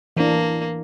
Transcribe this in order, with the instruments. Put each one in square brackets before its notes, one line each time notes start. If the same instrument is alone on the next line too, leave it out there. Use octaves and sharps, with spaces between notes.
[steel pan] E3 D4 [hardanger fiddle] A#3